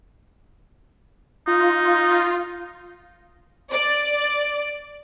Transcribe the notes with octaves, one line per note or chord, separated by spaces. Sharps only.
D#4 F4
D5